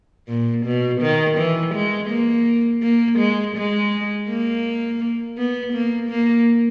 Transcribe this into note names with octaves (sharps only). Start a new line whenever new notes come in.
A#2
B2
D#3
E3
G#3
A#3
A#3
G#3
G#3
A#3
B3
A#3
A#3